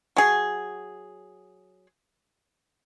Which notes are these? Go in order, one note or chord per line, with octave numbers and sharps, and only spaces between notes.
F#3 G#4